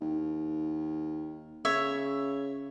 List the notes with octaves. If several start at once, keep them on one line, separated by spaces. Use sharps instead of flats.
D#2
C#3 C#5 E5